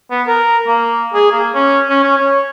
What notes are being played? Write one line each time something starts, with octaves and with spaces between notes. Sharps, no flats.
B3
A#4
A#3
G#4
A#3
C#4
C#4
C#4
C#5